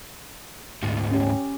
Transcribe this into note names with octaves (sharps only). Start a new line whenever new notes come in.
D2 G#2
C#4 G4